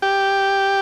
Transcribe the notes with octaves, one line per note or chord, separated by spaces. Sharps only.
G4